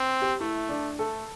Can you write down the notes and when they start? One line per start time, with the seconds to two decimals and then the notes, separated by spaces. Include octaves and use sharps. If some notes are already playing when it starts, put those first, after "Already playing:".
Already playing: C4
0.22 G4
0.40 A3 E4
0.69 D4
0.99 A3 A4